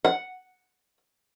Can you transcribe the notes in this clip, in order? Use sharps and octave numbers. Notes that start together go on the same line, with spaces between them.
F#5